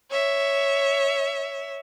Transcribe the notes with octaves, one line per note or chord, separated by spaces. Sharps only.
C#5 E5